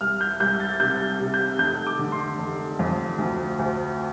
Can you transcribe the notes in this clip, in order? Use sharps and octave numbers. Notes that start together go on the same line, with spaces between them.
C2 F6
G6
C2 G6
A6
C3 G6
C3
G6
F1 G6
D6
D3
C6
F1
F2
D2
D2